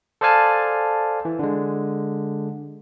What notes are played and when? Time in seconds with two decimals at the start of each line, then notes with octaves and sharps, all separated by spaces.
0.21 A4 C5 D5 F5 G#5 A5
1.25 E3
1.39 D3 G#3